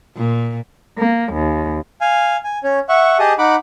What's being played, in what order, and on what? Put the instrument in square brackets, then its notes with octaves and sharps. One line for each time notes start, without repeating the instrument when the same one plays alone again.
[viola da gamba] A#2
[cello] A#3
D#2
[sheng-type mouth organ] F5 G#5
G#5
C#4 C#5
E5 F#5 C#6
G4 G#4 D#5 A5 D#6
D#4 F#5 B5 D6